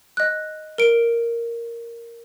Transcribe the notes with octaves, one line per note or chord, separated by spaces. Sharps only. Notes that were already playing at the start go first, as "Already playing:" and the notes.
D#5 F#6
A#4 D7